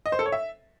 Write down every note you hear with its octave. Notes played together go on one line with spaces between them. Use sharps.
D#5
C5
A4
C#5
E5